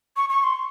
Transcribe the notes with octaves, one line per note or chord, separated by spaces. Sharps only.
C#6
C#6
C6